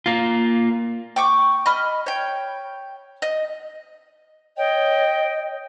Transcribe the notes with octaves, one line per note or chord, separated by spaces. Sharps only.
A#3 F4
G5 C#6 D6
D#5 B5 F6
C#5 G5
D#5
C#5 D#5 G5